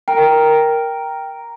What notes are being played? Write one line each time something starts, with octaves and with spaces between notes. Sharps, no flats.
A#4 G5